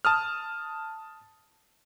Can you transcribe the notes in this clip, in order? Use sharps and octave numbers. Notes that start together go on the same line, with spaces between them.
A5 D#6 F6